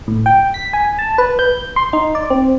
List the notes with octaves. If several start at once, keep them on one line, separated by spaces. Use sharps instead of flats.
A2
G5
B6
G#5
A5
B4
G6
C6
D#4
D5
C4